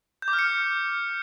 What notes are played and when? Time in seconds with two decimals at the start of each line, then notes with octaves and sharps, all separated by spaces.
0.22 G6
0.28 D6
0.33 F6
0.39 C#7